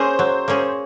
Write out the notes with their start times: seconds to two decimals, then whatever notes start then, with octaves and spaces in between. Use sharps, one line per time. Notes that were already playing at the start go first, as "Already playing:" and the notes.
Already playing: A#3 C#4 G#4 C5
0.19 F#3
0.48 A#3 C#4 G#4